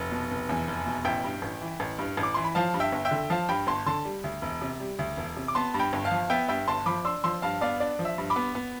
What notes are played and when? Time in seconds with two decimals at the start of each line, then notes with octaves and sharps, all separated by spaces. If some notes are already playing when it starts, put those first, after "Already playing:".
Already playing: F1
0.11 B2
0.31 F1
0.49 E2
0.68 F1
0.86 B2
1.05 A1 E5 G5
1.24 G2
1.42 A1
1.61 E3
1.80 A1
1.98 G2
2.17 A1
2.23 D6
2.34 E3 C6
2.44 B5
2.55 F3 F5 A5
2.74 G2
2.80 E5 G5
2.92 G1
3.05 E5 G5
3.11 D3
3.30 F3 F5 A5
3.48 G2 G5 B5
3.67 G1 A5 C6
3.86 D3 A5 C6
4.05 G3
4.24 D2
4.42 E1
4.61 C3
4.80 G3
4.99 D2
5.17 E1
5.36 C3
5.48 D6
5.55 B3 A5 C6
5.74 G2
5.79 G5 B5
5.93 G1
6.05 F5 A5
6.11 F3
6.30 B3 E5 G5
6.49 G2 E5 G5
6.68 G1 A5 C6
6.86 F3 B5 D6
7.04 D4 C6 E6
7.24 F3 C6 E6
7.42 G2 F5 A5
7.61 B3 D5 F5
7.80 D4 D5
7.99 F3
8.05 E5
8.18 G2
8.30 B5 D6
8.36 B3
8.55 B3